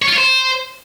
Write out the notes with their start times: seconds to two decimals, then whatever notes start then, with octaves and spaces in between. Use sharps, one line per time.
0.02 C#5
0.07 F4
0.13 C#5
0.18 C5